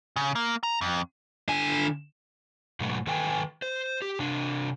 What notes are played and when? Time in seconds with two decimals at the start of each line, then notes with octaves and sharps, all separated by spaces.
0.16 C#3
0.36 A#3
0.63 A#5
0.81 F2
1.48 D3 G#5
2.80 G#2 B2 F#3 A3
3.07 D#3 A4 B4 G5 G#5
3.62 C5
4.02 G4
4.19 C3 D4